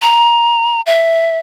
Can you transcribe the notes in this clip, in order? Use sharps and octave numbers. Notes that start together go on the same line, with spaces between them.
A#5
E5